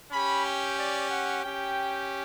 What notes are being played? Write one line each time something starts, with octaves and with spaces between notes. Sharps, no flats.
C#4 G4 B5
G5
D5
F#5
C#4 G4 G5